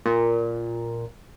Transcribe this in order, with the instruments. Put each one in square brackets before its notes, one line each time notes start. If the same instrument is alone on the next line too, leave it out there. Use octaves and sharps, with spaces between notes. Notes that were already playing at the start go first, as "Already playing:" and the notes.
[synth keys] A#2